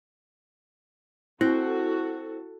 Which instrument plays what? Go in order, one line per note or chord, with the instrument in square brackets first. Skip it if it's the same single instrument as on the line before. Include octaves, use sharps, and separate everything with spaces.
[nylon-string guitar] C4 [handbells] E4 [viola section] F#4 A4